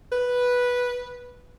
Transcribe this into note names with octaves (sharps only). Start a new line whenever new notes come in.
B4